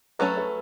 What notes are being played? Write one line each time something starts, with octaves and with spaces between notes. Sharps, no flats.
F#3 A3 C#4 E4 A4 B4
B4